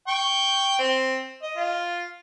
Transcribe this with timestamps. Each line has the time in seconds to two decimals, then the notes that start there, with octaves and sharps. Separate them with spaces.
0.08 G5 C#6
0.79 C4
1.43 D#5
1.57 F4